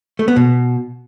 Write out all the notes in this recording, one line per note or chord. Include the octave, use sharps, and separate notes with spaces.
A3
B3
B2